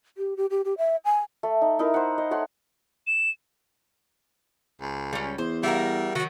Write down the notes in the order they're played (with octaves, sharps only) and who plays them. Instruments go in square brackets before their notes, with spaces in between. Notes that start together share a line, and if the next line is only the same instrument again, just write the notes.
[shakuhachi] G4
G4
G4
G4
E5
G#5
[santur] A3
D#4
D#4 E4 A#4
C5 F#5
D#5
A3 C#5 F#5 C6
[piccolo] E7
[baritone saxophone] C#2
[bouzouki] G3 C#4
[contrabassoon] E2 [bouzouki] C5
[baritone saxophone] G3 [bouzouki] E4 F#4 A#4
[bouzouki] D#3 F#3 [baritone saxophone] F#4